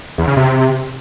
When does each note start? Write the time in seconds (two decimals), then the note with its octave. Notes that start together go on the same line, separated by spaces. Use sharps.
0.18 E2
0.27 C#3
0.37 C3